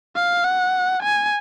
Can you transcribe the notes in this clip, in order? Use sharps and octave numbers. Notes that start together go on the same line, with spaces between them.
F5
F#5
G#5